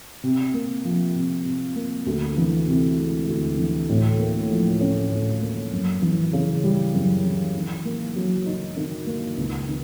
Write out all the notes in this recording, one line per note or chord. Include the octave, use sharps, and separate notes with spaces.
C3
A#3
F3
C3
C3
A#3
D2
E3
C3
G#3
D2
E3
A2
A#3
F3
C#4
A2
A#3
F#2
E3
C#3
G3
F#2
E3
D#3
A#3
F#3
D#4
D#3
A#3
C#2
D#3